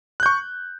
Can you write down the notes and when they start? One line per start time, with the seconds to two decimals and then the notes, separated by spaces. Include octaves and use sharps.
0.20 F#6
0.23 G6
0.26 C#6